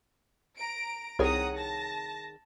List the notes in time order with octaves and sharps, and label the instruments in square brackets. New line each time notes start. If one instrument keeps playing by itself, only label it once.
[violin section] A#5 D7
[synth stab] C2 [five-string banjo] D#3 G#4 C#5 [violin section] F#5 A#5 D#6
[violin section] A5 A#6